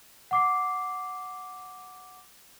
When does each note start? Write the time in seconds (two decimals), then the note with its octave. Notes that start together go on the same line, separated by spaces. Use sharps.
0.31 F#5 D6 C7